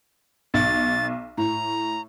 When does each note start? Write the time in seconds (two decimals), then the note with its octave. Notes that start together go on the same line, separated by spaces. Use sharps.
0.54 B1 A6
1.38 A2 A#5